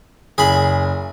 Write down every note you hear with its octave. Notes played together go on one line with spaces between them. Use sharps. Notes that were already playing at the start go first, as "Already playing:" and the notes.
F#1 G#4 B5